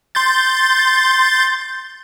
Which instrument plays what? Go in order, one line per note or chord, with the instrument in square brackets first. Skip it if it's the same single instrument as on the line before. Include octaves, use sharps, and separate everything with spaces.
[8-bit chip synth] C6 G6 A6